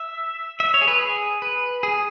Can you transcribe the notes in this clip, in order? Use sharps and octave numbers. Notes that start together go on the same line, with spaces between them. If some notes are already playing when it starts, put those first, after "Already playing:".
Already playing: E5
E5
C#5
G#4
B4
G#4
B4
G#4